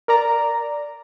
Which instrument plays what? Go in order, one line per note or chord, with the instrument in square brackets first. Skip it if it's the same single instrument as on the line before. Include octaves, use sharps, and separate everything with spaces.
[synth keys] A#4 D5 A#5